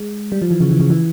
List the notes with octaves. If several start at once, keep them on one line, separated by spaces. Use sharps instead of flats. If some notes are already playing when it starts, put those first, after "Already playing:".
Already playing: G#3
G3
F3
E3
C#3
E3
C#3
E3